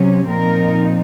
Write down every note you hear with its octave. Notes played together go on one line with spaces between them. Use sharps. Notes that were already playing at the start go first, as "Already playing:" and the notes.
Already playing: C3 F#3 C#4
A#2 F3 C4 D#4 A#4